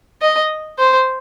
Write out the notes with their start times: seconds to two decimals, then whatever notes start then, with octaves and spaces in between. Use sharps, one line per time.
0.22 D#5
0.79 C5